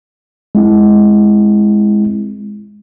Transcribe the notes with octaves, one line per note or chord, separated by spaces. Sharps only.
G#3 C4 E4